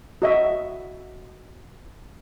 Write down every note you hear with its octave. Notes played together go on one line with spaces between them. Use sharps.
F#4 D#5 E5